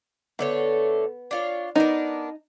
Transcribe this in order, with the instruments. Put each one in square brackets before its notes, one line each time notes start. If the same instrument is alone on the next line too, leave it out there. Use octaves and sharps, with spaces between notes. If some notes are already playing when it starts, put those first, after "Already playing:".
[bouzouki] D3 A3 C#5 [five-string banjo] B3
[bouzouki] D4 F4 C#5
[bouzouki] B3 D4 A#4 [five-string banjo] D#4